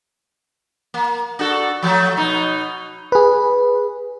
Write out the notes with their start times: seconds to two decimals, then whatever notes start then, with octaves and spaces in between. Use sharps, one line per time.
0.94 A#3
1.39 D4 F#4 A4
1.83 F3 F#3 A3
2.17 B2 D#4
3.12 G#4 B4